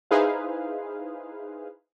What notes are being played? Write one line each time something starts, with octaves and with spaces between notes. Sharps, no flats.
D#4 E4 G#4 B4 C5 F5